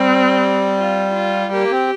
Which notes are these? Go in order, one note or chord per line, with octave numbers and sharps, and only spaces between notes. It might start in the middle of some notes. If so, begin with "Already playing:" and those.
Already playing: G3 C4
F4
F4
A#3 G4
C4